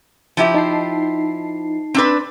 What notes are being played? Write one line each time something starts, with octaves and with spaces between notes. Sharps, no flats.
F3 E4 G4
D#4 A5 C7
C4 D4 B4